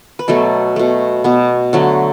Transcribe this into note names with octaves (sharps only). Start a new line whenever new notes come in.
B4
B2 F#3 A3 A4
B2 A3
B2 B3
D3 F#3 A3